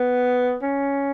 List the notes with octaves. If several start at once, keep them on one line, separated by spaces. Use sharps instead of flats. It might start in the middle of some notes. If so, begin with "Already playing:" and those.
Already playing: B3
C#4